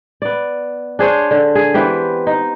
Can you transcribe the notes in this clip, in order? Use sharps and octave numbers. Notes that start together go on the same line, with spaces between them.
B3 D5
D4 G#4 C5 C#5
D3
G#4
E3 B3 C4 G4
D#4